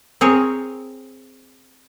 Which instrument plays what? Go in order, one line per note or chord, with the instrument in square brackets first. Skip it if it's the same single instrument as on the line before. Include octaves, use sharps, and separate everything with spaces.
[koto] C4 G#4 A#4 C#5